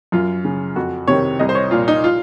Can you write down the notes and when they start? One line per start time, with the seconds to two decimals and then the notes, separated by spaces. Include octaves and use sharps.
0.12 F#2 F4
0.45 C#3
0.76 F2 F#4
1.08 C3 D#3 C#5
1.39 C2 D#5
1.49 C5
1.55 C#5
1.71 A#2 F4
1.88 D#4
2.04 F4